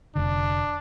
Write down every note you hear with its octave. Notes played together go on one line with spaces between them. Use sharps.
F1 D3 D4